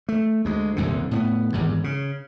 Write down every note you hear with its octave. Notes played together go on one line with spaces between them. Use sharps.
A3
D2 G#3
D#1 C2 F2 D3
A2 A#3 B3
G#1 E2 G2
C#3